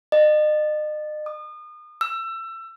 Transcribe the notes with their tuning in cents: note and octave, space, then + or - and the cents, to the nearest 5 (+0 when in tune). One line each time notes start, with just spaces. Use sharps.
D#5 -40
D#6 -35
E6 +25